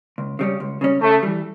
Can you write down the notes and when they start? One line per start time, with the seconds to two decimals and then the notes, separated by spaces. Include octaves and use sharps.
0.18 C#2
0.39 C#3 G3 C#4
0.60 C#2
0.81 C#3 G3 C#4
1.02 C#3 A3
1.23 E3 G3